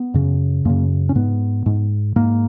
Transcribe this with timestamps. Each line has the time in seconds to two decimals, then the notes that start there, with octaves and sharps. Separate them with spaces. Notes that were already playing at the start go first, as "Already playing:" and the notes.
Already playing: B3
0.14 F#2 C#3
0.65 F#2 C#3 A#3
1.09 C#4
1.15 G#2 B3
1.66 G#2
2.16 G#2 A#3